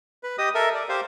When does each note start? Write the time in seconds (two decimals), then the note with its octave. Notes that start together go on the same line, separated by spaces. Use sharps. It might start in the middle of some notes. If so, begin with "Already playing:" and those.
0.23 B4
0.38 G4 D#5 D#6
0.55 A4 A#4 E5
0.74 D5
0.89 G4 C5 F5